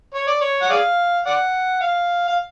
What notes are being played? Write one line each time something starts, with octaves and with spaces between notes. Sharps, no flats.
C#5
D5
C#5
F#5
G#4 D5 F5
D5 F#5
F5
F5